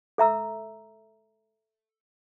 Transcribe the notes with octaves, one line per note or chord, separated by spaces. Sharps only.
A4 E5 A#5 E6